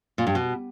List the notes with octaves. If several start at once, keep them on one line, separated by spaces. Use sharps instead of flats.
A#2
G2
B2